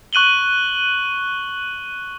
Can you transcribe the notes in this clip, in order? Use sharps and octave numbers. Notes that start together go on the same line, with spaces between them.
C#6 F#6 D#7 F#7 G7